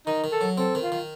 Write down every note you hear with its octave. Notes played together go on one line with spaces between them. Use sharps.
D#3 D#4
D#3
A4
F#3
C4 A4
D#3
F4
D#3